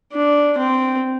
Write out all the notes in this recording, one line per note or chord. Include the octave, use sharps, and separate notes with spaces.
D4
C4